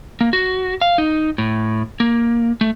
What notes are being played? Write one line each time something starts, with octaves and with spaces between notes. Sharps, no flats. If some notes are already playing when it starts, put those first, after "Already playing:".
A#3
F#4
F5
D#4
A2
A#3
A3